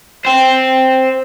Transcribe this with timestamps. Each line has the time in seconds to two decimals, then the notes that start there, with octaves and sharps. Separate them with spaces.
0.25 C5 G5